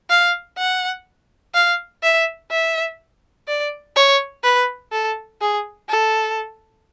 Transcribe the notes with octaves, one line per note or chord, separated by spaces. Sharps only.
F5
F#5
F5
E5
E5
D5
C#5
B4
A4
G#4
A4